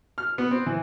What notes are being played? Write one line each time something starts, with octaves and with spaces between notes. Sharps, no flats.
F6
B3
C4
E3